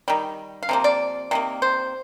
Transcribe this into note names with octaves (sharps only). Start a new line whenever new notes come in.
D#3 G3
F5
C3 F3 A#3
D5
C3 D#3 A#3
C5